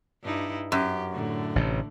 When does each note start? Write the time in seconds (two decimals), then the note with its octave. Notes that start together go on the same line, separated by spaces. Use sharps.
0.23 G2 D#4 E4
0.72 F#2 G4
1.12 A2 D3
1.56 A1 C3